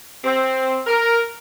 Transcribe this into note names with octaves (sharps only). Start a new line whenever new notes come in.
C4
A#4